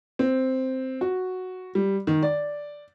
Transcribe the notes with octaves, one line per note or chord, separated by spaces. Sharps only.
C4
F#4
G3
D#3
D5